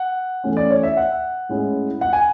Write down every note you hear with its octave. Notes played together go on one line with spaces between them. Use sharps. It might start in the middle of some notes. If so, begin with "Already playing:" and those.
Already playing: F#5
E3 A3 C#4
D5
C#5
E5
F#5
A2 G#3 C#4 E4
F#5
G#5